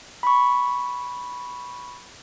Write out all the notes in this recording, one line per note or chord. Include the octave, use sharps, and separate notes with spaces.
B5 C#6